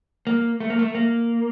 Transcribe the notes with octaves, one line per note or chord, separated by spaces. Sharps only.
A#3
A3
A#3
A3
A#3